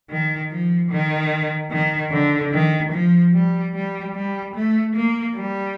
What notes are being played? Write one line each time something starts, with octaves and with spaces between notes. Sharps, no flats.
D#3
F3
D#3
D#3
D3
D#3
F3
G3
G3
G3
A3
A#3
G3